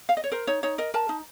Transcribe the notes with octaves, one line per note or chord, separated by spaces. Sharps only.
F5
D#5
C#5
A#4 C5
D#4 C#5
D#4 C#5
A#4 D#5
A#4 A5
D#4